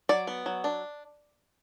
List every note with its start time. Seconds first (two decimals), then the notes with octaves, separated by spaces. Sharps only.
0.09 F#3 D5
0.27 B3
0.46 F#3
0.64 D4